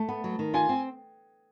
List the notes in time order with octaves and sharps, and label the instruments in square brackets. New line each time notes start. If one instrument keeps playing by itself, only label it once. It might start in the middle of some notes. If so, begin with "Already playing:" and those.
Already playing: [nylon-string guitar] A3 [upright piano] A5
[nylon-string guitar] B3
F#3
D#3
[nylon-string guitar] F4 [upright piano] G#5
[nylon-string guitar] C4